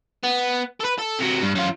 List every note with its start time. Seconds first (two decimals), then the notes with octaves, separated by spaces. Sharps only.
0.23 B3
0.80 A4 B4
0.98 A4
1.19 C3 F#3
1.42 G2
1.55 F#2 F4